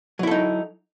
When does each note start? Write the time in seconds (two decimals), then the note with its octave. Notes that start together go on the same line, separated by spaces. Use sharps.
0.19 F#3
0.23 E4
0.27 A4
0.31 D#4